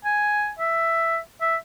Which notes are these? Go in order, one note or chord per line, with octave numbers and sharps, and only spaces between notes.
G#5
E5
E5